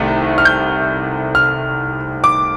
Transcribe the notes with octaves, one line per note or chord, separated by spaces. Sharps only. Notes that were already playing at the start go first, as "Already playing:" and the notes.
Already playing: C2 C3 D#3 A3
F6
G6
F6
D6